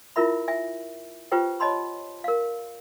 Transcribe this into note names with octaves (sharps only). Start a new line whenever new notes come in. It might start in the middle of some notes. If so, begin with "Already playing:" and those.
E4 F4 A#4 E5 B5
E5 G#5
F4 G4 B4 C5 G5
C#5 D#5 A5 B5 C6
A#4 F5